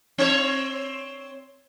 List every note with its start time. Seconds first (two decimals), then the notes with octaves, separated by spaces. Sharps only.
0.18 C4 C#5